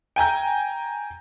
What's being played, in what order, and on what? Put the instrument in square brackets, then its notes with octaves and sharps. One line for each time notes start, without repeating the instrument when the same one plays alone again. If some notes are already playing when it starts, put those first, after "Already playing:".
[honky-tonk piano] G5 G#5 A#5 G6